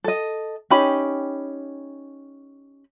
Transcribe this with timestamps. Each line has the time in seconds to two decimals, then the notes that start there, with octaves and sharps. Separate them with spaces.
0.04 A4 D#5
0.70 C#4 D#4 G4 B5